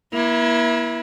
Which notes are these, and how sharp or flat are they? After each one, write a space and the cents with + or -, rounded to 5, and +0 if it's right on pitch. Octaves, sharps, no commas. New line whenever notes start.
A#3 +45 E4 +0